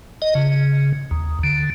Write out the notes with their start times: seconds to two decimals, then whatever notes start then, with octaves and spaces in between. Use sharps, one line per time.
0.22 D#5
0.35 C#3
1.11 D#2
1.44 D3